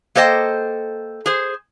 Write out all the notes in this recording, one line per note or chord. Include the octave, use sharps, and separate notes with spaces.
A#3 A4 C5 D#5 G5
G#4 C5